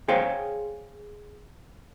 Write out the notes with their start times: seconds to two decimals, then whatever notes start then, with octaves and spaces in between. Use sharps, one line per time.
0.08 G#4 C5 C#5 F5 G5